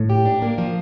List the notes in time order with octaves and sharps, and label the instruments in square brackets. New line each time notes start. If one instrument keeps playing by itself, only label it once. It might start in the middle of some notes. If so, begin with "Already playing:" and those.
Already playing: [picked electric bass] A2
[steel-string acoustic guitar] G4
D4
A#3
F3